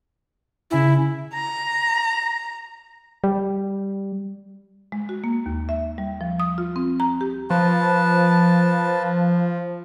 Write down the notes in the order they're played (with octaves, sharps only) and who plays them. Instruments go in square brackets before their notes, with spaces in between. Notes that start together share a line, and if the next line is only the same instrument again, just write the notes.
[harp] C#3 G#5 C7 [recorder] E4
[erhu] A#5
[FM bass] G3
[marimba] G#3
F#4
A#3
D#2
E5
G3
F3
D#6
F4
C4
A#5
G4
[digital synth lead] F3 [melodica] B4 A5